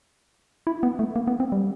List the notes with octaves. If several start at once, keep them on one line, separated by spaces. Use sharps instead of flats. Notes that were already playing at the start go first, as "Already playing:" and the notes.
E4
B3
A3
A#3
B3
C4
G3